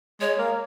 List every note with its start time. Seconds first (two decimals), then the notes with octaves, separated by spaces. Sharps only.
0.20 G#3 C#5
0.38 A#3